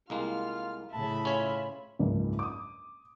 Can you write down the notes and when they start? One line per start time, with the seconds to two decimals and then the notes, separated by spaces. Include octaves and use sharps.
0.10 C2 G#3 A#3 F4 F6
0.93 A2 C#3 E5 A5 B5
1.25 C#4 F4 C#5
1.99 F#1 C#2 G#2 F3
2.39 D6 D#6